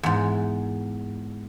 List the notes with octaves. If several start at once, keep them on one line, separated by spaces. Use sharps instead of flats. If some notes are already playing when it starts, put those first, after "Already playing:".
E2 G#2